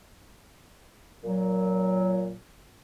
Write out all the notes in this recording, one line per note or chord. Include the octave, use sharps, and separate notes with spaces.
A#2 F#3